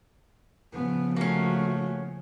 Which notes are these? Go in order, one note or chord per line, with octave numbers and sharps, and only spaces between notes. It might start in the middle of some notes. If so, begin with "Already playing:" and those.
C#3 F3 B3
A3 A#3 C#4 F#4